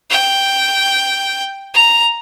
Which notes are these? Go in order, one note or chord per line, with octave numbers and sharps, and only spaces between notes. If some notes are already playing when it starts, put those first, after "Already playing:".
G5
A#5